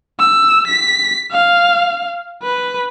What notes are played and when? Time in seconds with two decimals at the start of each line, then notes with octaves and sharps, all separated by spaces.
0.19 E6
0.68 B6
1.32 F5
2.43 B4